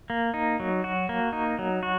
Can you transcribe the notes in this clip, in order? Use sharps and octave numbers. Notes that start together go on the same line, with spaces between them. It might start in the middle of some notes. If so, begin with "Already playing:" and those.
A#3
D#4
F#3
F#4
A#3
D#4
F#3
F#4